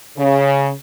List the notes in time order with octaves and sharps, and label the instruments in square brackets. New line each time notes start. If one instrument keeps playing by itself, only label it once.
[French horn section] C#3